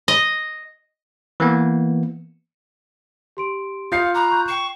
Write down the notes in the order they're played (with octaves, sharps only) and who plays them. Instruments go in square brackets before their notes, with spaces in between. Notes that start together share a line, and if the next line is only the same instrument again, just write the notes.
[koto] D#5
[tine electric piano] E3 A#3 B3
[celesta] G4 C6 D7
[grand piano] F4 C7 [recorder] F5 [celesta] D#6 G6 C#7
[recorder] A#5 [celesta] B5 D6 F#6
[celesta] C#6 F#6 G6
[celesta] G5 C7 E7 [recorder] C#6